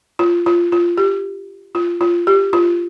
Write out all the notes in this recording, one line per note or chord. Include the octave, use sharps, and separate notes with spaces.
F4
F4
F4
G4
F4
F4
G4
F4